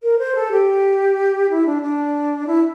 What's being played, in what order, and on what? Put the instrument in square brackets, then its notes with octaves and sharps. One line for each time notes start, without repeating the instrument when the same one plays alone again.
[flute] A#4
C5
A4
G4
E4
D4
D4
E4